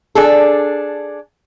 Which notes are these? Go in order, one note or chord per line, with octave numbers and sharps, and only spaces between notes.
D4 G#4 A4